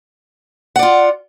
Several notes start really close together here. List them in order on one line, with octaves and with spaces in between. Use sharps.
F#5 D5 F4